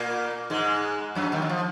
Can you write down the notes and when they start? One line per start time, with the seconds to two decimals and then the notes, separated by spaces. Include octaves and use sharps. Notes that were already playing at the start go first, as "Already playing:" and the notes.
Already playing: A#2 A#3
0.50 G#2 G#3
1.15 F#2 F#3
1.32 D#2 D#3
1.42 F#3
1.49 F3